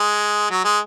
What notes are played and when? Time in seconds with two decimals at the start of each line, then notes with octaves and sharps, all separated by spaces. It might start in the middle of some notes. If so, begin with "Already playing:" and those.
Already playing: G#3
0.50 F#3
0.64 G#3